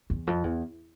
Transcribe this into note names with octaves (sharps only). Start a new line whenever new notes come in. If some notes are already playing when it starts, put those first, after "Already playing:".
E2
F2
E2